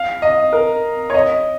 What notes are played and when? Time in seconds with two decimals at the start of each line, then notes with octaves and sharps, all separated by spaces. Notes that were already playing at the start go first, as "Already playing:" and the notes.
Already playing: F5
0.22 D#5
0.53 A#4
1.10 C#5
1.14 D#5